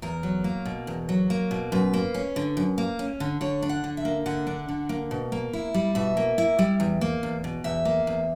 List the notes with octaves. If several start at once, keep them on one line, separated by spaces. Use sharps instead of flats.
E2 A#4
F#3
A#3
B2
E2
F#3
A#3
B2
F#2 B4
A#3
C#4
D3
F#2
A#3
C#4
D3
D3 C#5
D4
F#5
D3
E5
A#3
D3 F#5
D4
D3
A#3
B2
A#3
E4
G3
B2 E5
A#3
E4
G3
E2
A#3
E2
B2
E2 E5
A#3
E2